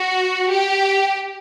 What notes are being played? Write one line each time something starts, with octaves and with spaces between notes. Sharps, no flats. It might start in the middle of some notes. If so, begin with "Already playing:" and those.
Already playing: F#4
G4